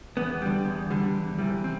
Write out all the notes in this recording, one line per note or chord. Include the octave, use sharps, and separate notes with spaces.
E2 B3
D3 G3
E2
D3 G3
E2
C3 E3 G3
C4